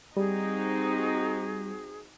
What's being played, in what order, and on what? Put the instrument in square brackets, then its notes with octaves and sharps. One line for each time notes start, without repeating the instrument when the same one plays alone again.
[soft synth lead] G3 [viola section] C4 D#4 F#4 [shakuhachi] G#4